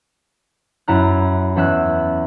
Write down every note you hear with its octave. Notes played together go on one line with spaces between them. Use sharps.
F#2 E4 A#5 F#6
E2 C#4 E5 F#6